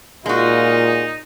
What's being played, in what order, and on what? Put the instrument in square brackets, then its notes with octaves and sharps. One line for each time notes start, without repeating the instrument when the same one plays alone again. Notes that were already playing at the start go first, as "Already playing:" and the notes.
[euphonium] A#2 [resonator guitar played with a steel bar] G#3 F#4 [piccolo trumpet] D#4 [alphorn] F4